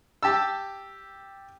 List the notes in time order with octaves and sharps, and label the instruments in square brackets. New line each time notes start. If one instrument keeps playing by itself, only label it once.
[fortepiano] G4 A5 E6